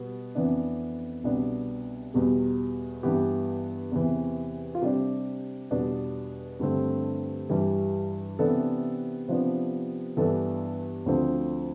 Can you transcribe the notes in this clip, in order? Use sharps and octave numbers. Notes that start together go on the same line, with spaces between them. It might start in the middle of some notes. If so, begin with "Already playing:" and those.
Already playing: B2 G3 B3
F2 E3 B3 D4
C2 B2 B3 D4
E2 B2 G3
G2 E3 B3 G4
E2 C3 E3
F4
C3 G3 D4 G4
E2 B2 G3 B3 D4
G2 D3 A3 C4
G2 E3 G3
C3 E3 B3 D4 A4
C3 F3 B3 D4
G2 E3 B3 D4 A4
D2 D3 F3 C4